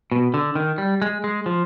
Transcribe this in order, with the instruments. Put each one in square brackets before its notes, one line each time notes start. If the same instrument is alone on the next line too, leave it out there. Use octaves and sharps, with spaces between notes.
[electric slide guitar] B2
D3
D#3
G3
G#3
G#3
F3